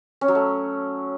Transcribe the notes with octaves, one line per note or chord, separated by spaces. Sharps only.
C#4
F#3
A3